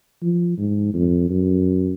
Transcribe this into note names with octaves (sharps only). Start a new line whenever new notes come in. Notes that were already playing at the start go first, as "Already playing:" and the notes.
F3
G#2
F2
F#2